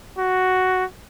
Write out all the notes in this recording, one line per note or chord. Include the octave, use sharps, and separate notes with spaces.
F#4